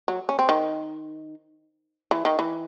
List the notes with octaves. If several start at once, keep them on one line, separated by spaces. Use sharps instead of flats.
F#3
C#4
C4
D#3
E3
D#3
E3